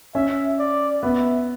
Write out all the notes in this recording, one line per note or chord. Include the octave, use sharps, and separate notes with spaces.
C#4 E5
D5
B3 E5